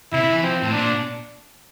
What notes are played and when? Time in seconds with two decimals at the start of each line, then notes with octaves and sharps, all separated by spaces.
0.13 C3 E4
0.23 C3
0.32 E3
0.43 F3 C4
0.63 A2
0.73 A#2 D4